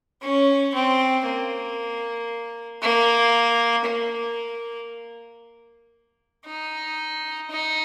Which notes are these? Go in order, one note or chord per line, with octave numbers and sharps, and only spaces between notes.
C#4
C4
A#3
A#3
A#3
D#4
D#4